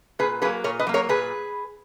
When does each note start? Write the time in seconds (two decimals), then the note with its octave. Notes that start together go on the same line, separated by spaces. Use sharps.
0.19 A#2 G#4 B4
0.42 F#3 G#4 B4
0.45 A#3
0.64 A#2 A#4 C#5
0.79 B4 D#5
0.87 F#3 A#3
0.94 A#4 C#5
1.09 A#2 G#4 B4